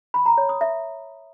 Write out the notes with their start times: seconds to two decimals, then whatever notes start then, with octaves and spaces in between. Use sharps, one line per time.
0.14 B5
0.26 A#5
0.37 C#5
0.49 D#6
0.61 E5